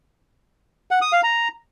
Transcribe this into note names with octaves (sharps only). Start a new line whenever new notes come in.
F#5
D#6
F5
A#5